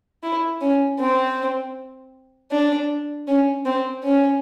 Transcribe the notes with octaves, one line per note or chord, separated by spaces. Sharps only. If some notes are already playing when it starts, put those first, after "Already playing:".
E4
C#4
C4
D4
C#4
C4
C#4